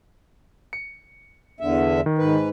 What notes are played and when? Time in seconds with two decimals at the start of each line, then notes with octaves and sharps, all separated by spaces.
0.73 C#7
1.60 E2 D3 E5
2.06 D#3
2.18 G#2 B4